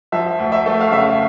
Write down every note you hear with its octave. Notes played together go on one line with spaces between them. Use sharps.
F3 E5
D2
E5
A3
F5
C#3 E5